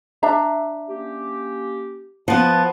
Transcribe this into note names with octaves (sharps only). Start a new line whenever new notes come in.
D4 E5 A#5
A#3 C#4 G4
F3 B3 A5